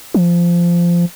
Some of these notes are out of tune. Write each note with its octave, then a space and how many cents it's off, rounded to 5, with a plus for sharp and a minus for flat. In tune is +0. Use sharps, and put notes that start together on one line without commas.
F3 -15